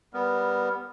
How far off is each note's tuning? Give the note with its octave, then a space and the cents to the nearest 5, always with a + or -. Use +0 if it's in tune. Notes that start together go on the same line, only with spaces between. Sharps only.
G3 +0 B3 +0 A#4 +0